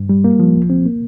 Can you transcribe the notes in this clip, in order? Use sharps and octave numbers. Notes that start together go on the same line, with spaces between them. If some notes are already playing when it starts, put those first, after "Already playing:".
Already playing: G2
G3
A#3
F3
C2
C4
A#3